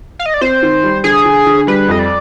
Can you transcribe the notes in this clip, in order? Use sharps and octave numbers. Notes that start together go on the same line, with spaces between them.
F5
D#5
D5
C4 C5
D#3
G3
D3 G#4
D3
D3
G3 B4
F2 D#5
D5